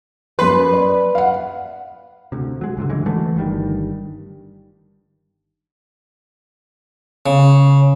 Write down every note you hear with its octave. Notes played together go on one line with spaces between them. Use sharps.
F#2 B4 C6
D5
F5 F#5
D2 C3
F#3 G#3
C#2 G#2 B2 D3
D2 C#3 E3 G#3
E3 F#3 G#3 A3
G1 G2 D#3 G3
C#3